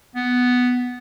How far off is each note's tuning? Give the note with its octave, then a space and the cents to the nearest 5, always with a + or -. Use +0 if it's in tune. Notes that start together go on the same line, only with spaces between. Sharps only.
B3 +5